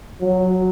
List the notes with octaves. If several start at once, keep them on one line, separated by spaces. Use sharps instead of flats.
F#3